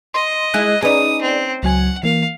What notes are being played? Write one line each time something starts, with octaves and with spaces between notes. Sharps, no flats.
D#5 C6
G#3 E4 G#4 F#6
C#4 D#4 G#4 B4 D5 D#6
C4
C#2 F#3 F#5 G#5
E3 A#3 F5